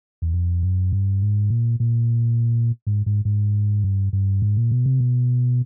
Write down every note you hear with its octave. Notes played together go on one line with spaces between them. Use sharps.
E2
F2
F#2
G2
G#2
A#2
A#2
G#2
G#2
G#2
G2
G2
G#2
A#2
B2
C3
B2